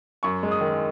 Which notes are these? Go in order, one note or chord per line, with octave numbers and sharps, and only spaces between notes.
F#2 C#6
G#3
D#6
D#3